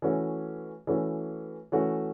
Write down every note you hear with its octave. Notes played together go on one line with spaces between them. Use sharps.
E3 A3 C#4 F#4
E3 A3 C#4 F#4
E3 A3 C#4 F#4